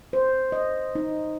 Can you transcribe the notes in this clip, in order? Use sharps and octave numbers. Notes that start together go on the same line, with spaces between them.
C5
D#5
D#4